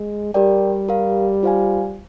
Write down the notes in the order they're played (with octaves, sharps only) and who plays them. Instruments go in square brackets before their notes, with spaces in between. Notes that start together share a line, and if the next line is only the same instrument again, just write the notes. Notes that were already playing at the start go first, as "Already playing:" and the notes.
Already playing: [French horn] G#3
[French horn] G3 [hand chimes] G4 A#4 D5 G5
[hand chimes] G4 A#4 F5
F4 C5 F5 G#5